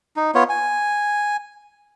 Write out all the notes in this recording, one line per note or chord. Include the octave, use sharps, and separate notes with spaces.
D#4
B3 F4 C#5
G#5